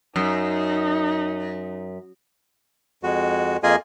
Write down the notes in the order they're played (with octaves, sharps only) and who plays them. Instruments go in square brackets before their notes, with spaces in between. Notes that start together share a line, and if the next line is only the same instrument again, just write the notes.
[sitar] F#2 [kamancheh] D#4
[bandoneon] F2 G#3 F#4
F2 A#3 F4 G#4 D#5 G#5